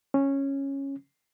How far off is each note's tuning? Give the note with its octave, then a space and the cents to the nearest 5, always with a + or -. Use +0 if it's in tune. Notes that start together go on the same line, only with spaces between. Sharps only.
C#4 -10